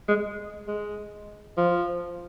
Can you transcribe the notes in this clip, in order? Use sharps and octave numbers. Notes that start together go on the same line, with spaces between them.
G#3
G#3
F3